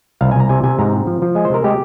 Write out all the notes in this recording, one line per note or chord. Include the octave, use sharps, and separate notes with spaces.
C2 F5
G#5
C2 A#5
C3 G#5
C3 G#5
G#2 A#5
C4
F3
F3
G#3 G#5
C5
C3 A#4
G#3 G4